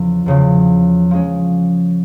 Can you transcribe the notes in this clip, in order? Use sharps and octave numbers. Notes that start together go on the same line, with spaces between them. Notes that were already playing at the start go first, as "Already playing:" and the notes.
Already playing: E2 C#3 F3
E2 C#3 F3
F3 G#3 C#4